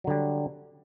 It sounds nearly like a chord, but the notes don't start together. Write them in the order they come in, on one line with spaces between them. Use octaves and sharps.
F#3 D3 G3